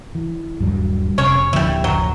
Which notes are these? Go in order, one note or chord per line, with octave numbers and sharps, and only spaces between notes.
E3
D#1 G2 F#3 G3
F1 C3 C#4 C#5
D1 D3 F3 G3 A#3 E4
F#1 F#3